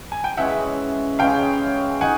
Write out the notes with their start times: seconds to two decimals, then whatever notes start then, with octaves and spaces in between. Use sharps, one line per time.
0.12 G#5
0.24 G5
0.37 C#3 E3 G#3 C#4 E5 F#5
1.19 C#3 E3 G#3 C#4 F5 G5
2.01 D#4 F#4 F#5 G#5